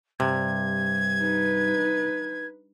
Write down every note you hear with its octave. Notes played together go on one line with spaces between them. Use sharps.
G2 C3 G#6
D#4 B4